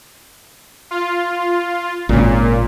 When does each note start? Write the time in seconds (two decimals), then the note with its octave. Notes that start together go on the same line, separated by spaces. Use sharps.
0.91 F4
2.09 G#1 A#2 C#3